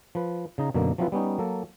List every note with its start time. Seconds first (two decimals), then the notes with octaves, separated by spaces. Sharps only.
0.15 F3 B4
0.58 C#3 D#4 A#5
0.74 F#2 B2 D3 A#3
0.98 F3 F#3 C4 E4 F4 B4
1.12 G3 B3 C#4 D#4
1.39 F#3 A#3 A4